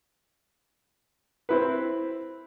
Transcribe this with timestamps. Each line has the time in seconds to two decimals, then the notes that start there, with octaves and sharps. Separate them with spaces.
1.49 C4 E4 B4